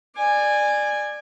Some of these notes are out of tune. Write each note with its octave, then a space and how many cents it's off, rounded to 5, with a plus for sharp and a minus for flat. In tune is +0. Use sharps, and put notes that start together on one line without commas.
D5 +20 G#5 -10